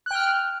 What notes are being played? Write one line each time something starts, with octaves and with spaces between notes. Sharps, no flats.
G5 F6 F#6